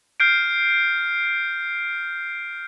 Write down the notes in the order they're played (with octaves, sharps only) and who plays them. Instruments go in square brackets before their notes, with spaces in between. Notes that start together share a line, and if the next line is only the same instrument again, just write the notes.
[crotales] F6 G6 C7 D7